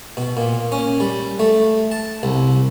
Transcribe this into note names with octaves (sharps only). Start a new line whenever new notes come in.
B2
A#2
C#4
G3
A3
A5
C2